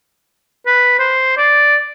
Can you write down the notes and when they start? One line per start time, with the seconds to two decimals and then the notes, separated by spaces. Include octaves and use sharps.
0.66 B4
0.99 C5
1.37 D5